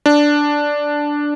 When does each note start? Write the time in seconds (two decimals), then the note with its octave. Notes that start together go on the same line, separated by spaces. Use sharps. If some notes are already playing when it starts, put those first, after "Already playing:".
0.06 D4